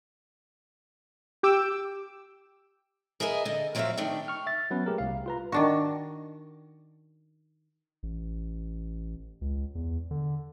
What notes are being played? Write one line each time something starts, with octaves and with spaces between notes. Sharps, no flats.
G4 G5 D6 E6
G#4 A#4 B4 D#5 E5 G#5
D3 D#5
F3 F#3 C4 C5 E5 F5
D#3 A3 D4 G4
C#6 F6
E5 A6
F#3 B3 C#4 B4
A3 G4 G#4 A#4
C2 F5
F4 B4 A#5
D#3 D4 F#4
A1
C#2
E2
D3